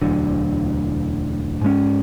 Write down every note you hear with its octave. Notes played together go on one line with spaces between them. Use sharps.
E1 D2 D3 F#3
G#2 G#3 C#4